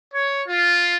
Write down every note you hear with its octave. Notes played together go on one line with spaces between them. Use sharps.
C#5
F4